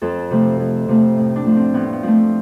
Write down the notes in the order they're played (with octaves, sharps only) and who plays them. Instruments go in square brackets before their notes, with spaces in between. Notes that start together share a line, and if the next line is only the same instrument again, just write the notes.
[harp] F2 A4
C3 F3 A3
F2
C3 F3 A3
A2
D4
F3 A3
C4
A2 B3
B3
F3 A3 C4